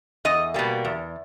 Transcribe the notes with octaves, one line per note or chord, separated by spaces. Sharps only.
E2 D#5
B2 G3 A#3
E2